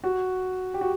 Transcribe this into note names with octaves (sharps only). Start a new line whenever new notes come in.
F#4
G4
F#4